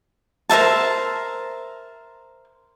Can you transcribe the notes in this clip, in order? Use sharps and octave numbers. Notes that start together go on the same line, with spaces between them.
A#4 C5 E5 A5